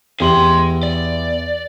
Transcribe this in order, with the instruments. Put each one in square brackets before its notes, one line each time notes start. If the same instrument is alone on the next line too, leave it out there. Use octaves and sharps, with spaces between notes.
[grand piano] E2 G4 F#7 [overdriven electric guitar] G#4 C6
[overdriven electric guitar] D5